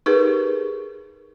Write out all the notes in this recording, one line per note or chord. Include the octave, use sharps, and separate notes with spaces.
D#4 G4 G#4 A#4 B4